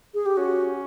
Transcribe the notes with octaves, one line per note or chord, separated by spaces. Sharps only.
G#4
G4
C#4 F#4